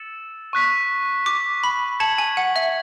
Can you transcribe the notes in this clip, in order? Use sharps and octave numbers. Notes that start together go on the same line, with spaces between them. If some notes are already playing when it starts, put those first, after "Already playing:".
Already playing: E6 A6 C#7 E7
C#6 F#6 B6
D6
B5
A5 G#6 C#7 F#7
G#5
F#5
E5